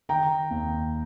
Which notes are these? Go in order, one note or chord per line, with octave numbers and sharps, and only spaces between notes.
D#3 G5 A#5
D#2